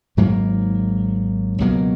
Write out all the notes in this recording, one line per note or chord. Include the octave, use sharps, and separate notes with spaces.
G#1 G#2 F#3 A#3
C#2 B2 F#3 A#3